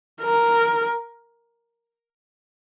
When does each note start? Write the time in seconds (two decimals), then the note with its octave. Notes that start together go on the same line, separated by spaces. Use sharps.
0.22 A#4